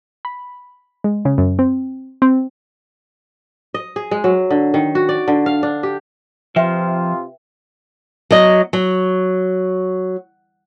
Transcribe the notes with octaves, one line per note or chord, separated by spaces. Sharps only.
B5
G#3
C#3
F#2
C4
C4
D#5
G#4
G#3
F#3
D3
D#3
F#4
D5
D3
F5
D4
G4
C3 F3 C4 F4 B4 E5 G5
F#3 D#5
F#3